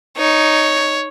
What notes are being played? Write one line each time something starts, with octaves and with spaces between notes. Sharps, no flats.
D#4 C#5